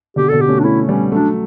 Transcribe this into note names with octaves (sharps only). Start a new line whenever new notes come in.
B2 D3 G4
B2 D3 A4
G4
A3 C#4
D4
A3 C#4 E4
G3 B3 C#4
F#3 A3 D4